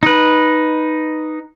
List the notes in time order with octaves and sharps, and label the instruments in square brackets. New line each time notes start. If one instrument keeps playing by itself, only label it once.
[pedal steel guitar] D#4 B4